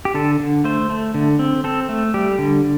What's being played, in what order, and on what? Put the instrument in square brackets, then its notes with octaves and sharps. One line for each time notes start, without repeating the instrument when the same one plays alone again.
[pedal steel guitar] G4
D3 A4
D3
A3 C5
A3
D3
C4
C4 A4
A3
G3 G4
D3